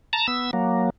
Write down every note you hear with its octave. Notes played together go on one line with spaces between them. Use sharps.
A5 A#5
B3 E6
F#3 A#3